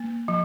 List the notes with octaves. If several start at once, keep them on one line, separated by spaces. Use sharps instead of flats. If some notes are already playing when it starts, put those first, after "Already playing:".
Already playing: A#3
F3